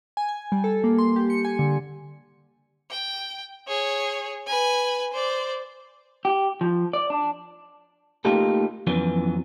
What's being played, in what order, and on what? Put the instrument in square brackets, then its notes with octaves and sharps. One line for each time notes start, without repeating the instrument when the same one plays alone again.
[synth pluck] G#5
G#5
G3
A4
A#3
C6
G4
C#7
G#5
D3
[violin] G5
G#4 C#5
B4 G#5
C5 D5
[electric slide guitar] G4
F3
D5
D4
[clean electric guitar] A3 A#3 D#4 F4 G4 A4
F2 E3 F#3 B3 C#4